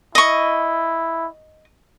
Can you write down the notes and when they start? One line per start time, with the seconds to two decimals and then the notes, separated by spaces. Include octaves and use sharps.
0.15 E4 D#5 C#6